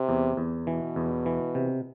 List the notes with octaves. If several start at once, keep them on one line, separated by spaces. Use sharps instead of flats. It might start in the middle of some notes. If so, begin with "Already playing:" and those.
Already playing: C3
E2
E2
B2 E3
E2
E3
C3